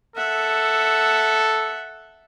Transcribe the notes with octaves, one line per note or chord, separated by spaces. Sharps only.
A4 E5 F#5